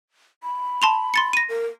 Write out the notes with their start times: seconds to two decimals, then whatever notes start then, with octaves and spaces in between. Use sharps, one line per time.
0.43 B5
0.82 A5 C6 F7
1.14 C6 A6 C#7
1.33 A#6 D#7
1.49 A#4